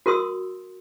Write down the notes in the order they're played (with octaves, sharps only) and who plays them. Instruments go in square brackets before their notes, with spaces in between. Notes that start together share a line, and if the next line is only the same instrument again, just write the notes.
[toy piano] F#4 A#4 C6 D#6 E6